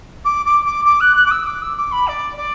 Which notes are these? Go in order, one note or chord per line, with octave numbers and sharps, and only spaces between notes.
D6
D6
D6
D6
F#6
F#6
D6
E6
D6
E6
D6
B5
D5
D5